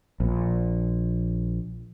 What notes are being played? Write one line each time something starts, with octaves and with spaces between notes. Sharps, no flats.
A#1 A#2